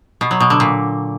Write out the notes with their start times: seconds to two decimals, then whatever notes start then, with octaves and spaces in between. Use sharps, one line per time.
0.21 B2
0.31 F#3
0.40 B2
0.50 D3
0.60 A#2